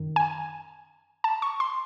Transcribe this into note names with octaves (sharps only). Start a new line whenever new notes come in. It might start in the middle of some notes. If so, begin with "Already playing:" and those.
Already playing: F#2 D#3
G#5
A5
C#6
C6